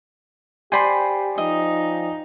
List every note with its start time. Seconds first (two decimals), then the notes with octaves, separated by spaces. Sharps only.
0.72 G4 C5 D5 G5 G#5 B5 C6
1.38 F3 D#4 D#5